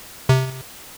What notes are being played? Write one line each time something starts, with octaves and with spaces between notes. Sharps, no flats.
C3